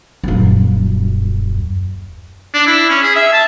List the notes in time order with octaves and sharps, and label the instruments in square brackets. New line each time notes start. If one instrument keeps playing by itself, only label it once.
[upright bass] D#1 F#2
[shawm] D4
E4
C#4
G#4
E5
A5